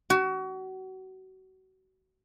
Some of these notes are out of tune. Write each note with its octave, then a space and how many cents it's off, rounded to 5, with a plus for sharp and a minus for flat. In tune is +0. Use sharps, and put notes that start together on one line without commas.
F#4 +30